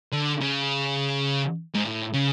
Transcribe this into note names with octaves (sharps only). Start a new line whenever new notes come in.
D3
C#3
G#2
A2
C#3